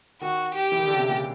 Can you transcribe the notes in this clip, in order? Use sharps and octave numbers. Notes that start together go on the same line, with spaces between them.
D#3 F#4
G4
E3
D#3
D3
C#3
C3
A#2